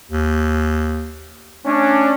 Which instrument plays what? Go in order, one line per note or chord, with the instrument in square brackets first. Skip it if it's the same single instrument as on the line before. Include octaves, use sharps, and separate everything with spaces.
[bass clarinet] D#2
[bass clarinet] A3 [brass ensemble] C#4 D4